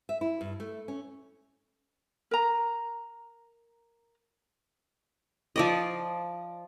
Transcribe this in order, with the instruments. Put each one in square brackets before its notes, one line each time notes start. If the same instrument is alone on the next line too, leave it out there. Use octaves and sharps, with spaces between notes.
[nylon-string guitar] E5
E4
G2
A3
C#4
[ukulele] A#4 A#5
[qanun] F3 D5 D#5